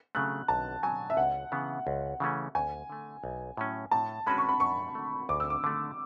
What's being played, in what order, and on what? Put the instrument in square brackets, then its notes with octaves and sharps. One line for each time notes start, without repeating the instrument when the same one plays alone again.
[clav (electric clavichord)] C#3 F#3 A3 [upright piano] F#6
[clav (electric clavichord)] B1 [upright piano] A5
[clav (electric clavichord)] B2 F#3 [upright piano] G#5
[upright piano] E5
[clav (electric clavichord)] C#2 [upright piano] F#5
[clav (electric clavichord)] C#3 E3 B3
C#2
C#3 E3 A3 C#4
[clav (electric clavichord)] D2 [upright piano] G#5
[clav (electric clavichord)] D3 A3
B1
A2 F#3 C#4
[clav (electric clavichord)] A2 [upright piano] A5
[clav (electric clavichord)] G#3 C#4 F#4 B4 [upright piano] B5
[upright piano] C#6
B5
[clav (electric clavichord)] F#2 [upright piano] C#6
[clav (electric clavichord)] D3 A3
[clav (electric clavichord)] D2 [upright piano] D6
[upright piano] E6
D6
[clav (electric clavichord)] D3 A3 [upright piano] D6